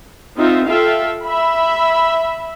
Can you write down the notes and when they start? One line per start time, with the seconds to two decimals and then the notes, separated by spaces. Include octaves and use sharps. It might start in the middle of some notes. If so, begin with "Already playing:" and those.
0.37 C4 D#4 F4 E5
0.68 F4 A4 E5 F5 G5
1.25 E5 B5